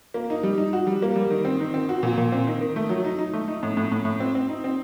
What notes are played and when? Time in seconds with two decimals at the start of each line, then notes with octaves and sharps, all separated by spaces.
0.14 A#3
0.30 D#4
0.43 G3
0.58 D#4
0.73 F#4
0.87 G3
1.02 A#3
1.16 G3
1.30 D#3
1.45 C4
1.60 D#3
1.74 C4
1.89 F#4
2.03 A#2
2.18 A#2
2.32 C4
2.47 D#3
2.60 D#3
2.76 A3
2.89 F#3
3.04 D#4
3.19 D#4
3.34 A3
3.48 D#4
3.63 A2
3.77 A2
3.92 A2
4.05 A2
4.20 C4
4.35 C4
4.49 D#4
4.64 C4